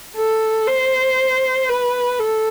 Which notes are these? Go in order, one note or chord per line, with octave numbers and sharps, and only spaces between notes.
A4
C5
B4
A4